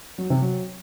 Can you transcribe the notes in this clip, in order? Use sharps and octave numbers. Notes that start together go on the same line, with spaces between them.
F#3
C3
F#3